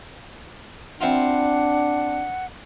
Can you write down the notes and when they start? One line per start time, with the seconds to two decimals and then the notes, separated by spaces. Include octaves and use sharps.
1.01 C4 D4 E4 F4 F#5